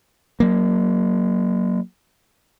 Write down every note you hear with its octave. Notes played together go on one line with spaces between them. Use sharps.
F#3 A#3